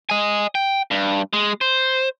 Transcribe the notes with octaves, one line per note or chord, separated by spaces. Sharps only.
D#5 G#5
G5
G2
G#3
C5